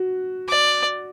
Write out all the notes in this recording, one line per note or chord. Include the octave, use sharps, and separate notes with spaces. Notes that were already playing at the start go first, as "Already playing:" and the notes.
Already playing: F#4
D5